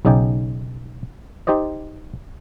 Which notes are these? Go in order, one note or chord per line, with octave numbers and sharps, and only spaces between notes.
B1 C#3 D#4 D5 G5 G#5
D#4 G4 C5 D5 D#5